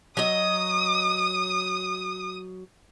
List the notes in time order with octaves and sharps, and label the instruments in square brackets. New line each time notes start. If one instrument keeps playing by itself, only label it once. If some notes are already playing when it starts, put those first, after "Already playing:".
[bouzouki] F#3 D#5 [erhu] D#6